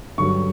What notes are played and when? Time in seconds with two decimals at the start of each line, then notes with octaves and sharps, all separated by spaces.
0.18 G2 D3 F#3 C#6